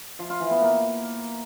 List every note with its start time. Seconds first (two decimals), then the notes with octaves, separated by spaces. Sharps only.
0.19 F3
0.30 F4
0.40 E3
0.51 B3
0.61 A#3